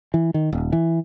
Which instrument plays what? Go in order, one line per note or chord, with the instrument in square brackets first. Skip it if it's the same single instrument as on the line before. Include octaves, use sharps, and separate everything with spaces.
[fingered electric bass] E3
D#3
D#1
E3